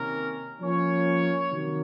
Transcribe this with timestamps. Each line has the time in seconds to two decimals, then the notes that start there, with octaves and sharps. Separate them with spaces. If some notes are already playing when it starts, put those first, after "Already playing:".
Already playing: C3 D#3 A#3 C#4 A#4
0.61 F3 A#3 C#4 C#5
1.51 C3 D#3 F#3 A#3